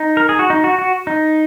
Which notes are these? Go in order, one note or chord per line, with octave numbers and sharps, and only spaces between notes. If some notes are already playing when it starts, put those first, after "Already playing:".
Already playing: D#4
A#4
G#4
F#4
D#4
F#4
F#4
D#4